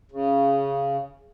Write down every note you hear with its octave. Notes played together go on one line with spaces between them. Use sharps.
C#3